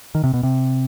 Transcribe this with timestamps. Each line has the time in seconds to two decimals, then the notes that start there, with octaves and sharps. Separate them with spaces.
0.15 D#3
0.24 C3
0.34 B2
0.43 C3